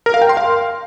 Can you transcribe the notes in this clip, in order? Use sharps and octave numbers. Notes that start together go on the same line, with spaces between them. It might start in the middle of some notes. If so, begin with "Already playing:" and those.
A#4
F5
G5
C6
F5